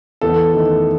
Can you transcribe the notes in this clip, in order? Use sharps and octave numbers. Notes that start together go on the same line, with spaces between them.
E2 A4
D#3 A3